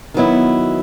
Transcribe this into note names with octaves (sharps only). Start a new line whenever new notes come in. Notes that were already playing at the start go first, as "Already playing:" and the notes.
D#3 F#3 B3 E4